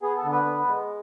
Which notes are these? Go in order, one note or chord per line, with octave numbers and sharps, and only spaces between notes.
B3 G#4
A4
D3
B4
B3
G#3